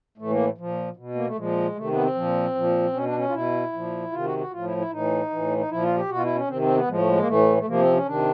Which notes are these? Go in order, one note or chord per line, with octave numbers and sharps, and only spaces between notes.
A2 E3 A3
A#3
A#2 F3
B2
A#3
A3
A#2 F3 G#3
C3 D#3 A3
B3
C4
A#2 F3
A#2 F3
B2 C#4
D4
C#4
F4
B2 E4
A#2 F3
C3 D#3 F4
F#4
F#4
A2 F3 F4
E4
E4
A2 E3 D#4
A2 E3
D#4
A#2 F3 E4
F4
G4
B2 F#4
F4
E4
C#4
C3 D#3 C4
C4
B3
A2 F3 G#3
A3
G#3
A#3
A2 E3 A3
A3
C3 F3 A#3
C4
C#4
C3 D#3 D4